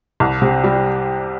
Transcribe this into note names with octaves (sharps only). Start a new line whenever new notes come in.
C2
C3
G3